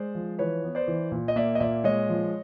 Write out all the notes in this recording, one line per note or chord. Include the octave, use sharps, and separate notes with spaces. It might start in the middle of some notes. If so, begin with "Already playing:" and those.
Already playing: G#3 C5 D5
F3
E3 B4 C#5
B3
C5 D5
E3
A#2
D#5
A#3 D5 E5
D#5
A#2 D5 E5
G#3 C#5 D#5
F3